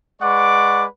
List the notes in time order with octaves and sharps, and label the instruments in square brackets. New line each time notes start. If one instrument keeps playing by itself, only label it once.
[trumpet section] G#3 B4 D5 F#5 C#6 D6